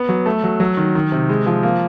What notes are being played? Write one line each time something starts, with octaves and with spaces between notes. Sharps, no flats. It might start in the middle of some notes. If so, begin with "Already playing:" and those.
Already playing: B3
F#3
A3
F#3
F#3
D#3
D#3
C3
G#3
F3
A#3